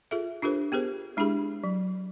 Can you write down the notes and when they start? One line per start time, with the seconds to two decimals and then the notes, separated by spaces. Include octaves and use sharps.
0.11 F4 G#4 A4 E5
0.42 D4 F4 G4 A4 A#4 C5
0.72 B3 G4 G#4 A#4 C5
1.17 G#3 D4 E4 G4 G#4 B5
1.64 F#3